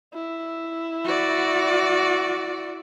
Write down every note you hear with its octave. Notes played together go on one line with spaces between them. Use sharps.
E4
F#4 D5